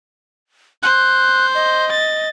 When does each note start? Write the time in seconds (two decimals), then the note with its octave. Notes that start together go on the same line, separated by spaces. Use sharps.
0.83 C5 F#6
1.55 D#5
1.91 A6